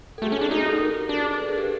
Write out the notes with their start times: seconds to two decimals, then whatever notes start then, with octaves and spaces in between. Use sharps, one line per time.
0.18 A4
0.22 A3 F#4 G#4
0.32 C#4
0.37 D4 F#4 G#4
0.51 D#4 F#4 G#4
0.66 G4 A4
0.80 G#4 A#4
1.09 D4
1.38 A4 B4
1.48 G#4 A#4
1.58 G4 A4